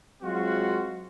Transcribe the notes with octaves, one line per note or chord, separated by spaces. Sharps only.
F#3 G#3 C4 F4 F#4